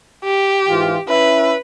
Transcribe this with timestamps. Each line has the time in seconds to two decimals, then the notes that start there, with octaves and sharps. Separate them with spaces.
0.24 G4
0.69 G#2 E3 F4
1.08 C#4 E4 B4 E5